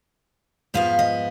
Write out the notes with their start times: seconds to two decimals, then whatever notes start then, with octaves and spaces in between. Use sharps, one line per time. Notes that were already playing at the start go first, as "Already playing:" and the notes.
0.74 G#2 F3 B3 F5
0.99 D#5